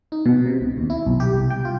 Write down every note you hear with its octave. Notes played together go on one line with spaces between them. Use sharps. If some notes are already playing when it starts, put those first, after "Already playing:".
D#4
B2
C3
C#2
D#2
E4
B1
G4
C2
G5
F4